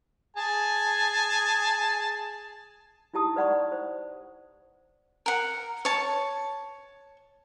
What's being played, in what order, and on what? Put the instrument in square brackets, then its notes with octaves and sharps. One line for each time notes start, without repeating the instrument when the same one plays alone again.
[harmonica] G#4 G#5 A5
[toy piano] D#4 E4 G4 A5 D#6
B4 D5 F#5 B5 C#6
C5
[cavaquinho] A#4 F#5
C#5 A5